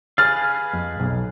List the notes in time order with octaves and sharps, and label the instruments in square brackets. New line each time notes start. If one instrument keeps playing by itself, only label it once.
[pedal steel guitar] G#4 B4 F5 [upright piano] F6 A6
[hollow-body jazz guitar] F2
B1